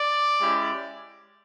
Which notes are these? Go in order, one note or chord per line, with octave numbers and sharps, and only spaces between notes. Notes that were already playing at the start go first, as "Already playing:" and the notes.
Already playing: D5
G#3 C#4 E4 G4